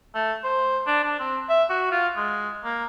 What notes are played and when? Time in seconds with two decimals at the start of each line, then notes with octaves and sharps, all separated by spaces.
0.15 A3
0.44 C5
0.87 D4
1.04 D4
1.20 C4
1.49 E5
1.70 F#4
1.92 F4
2.16 G#3
2.65 A#3